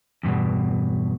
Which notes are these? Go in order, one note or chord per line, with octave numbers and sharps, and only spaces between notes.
E2 G2 B2